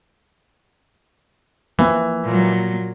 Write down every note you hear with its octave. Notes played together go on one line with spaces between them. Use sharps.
E3 F3 A#3 C4
A#2 F#3